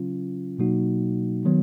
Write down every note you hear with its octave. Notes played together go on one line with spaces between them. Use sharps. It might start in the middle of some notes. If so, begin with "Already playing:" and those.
Already playing: C#3 F#3 C#4 F4
B2 F#3 A#3 D#4 F#4
D#3 F#3 B3